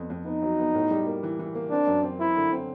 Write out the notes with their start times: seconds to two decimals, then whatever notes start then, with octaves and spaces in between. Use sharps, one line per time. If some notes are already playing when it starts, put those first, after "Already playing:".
Already playing: F2 B3
0.10 F2
0.26 B3 D#4
0.42 F#3
0.59 B3
0.74 A2
0.91 G3
1.06 A#3
1.23 E3
1.39 E3
1.55 A#3
1.71 C4 D4
1.87 F#2
2.03 C4
2.20 C4 E4
2.36 D3
2.52 C4